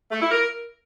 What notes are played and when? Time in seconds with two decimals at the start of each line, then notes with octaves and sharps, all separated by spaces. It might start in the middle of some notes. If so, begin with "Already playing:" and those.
0.11 A3
0.21 E4
0.31 A#4